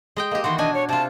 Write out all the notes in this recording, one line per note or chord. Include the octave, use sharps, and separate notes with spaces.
G#3 D#5 G5
A#3 G4 D#5
D#3 E3 F#4 C6
B2 D4 D#5 G#5
C#5
C3 F4 A5